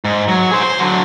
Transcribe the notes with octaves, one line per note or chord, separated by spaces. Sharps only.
G#2
F#3
G#4 C5
C5
D3 F#3